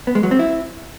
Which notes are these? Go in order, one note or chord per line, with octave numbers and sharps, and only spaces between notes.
B3
G#3
F#3
C4
E4